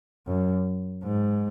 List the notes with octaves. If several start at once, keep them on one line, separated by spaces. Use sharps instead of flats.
F#2
G#2